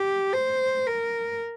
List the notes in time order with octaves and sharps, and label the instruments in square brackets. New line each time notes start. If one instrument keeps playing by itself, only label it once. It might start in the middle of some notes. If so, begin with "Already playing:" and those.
Already playing: [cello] G4
C5
A#4